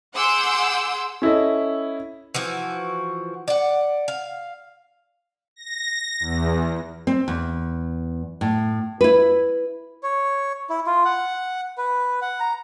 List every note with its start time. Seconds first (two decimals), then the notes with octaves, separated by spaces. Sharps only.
0.14 G#4 F#5 C6 D6 E6 G6
1.22 C#4 E4 A4 D#5
2.34 E3 F3 F#4
3.48 D5 F#5
4.08 F5
5.56 A#6
6.20 E2
7.07 C4
7.28 E2
8.41 A2
9.01 E4 B4
10.03 C#5
10.70 E4
10.86 F4
11.05 F#5
11.78 B4
12.22 F#5
12.40 A#5